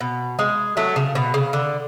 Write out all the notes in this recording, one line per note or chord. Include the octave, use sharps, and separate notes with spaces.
B2
G#3
F#3 A3
C#3
B2
C#3
D3